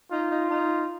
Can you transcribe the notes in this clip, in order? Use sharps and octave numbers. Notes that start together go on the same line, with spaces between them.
D#4 F4
D#4
D#4